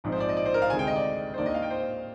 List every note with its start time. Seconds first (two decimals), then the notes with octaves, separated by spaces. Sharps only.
0.04 A#1 G#2 F3 C4 D#4
0.12 C5
0.20 D5
0.29 D#5
0.37 D5
0.46 C5
0.54 A#4
0.62 F5
0.70 D2 C3 D#3 G#3 G#5
0.79 G5
0.87 D#5
0.96 D5
1.34 C5
1.38 D#2 D#3 A#3 D4 D5
1.46 D#5
1.54 F5
1.62 G5
1.70 C5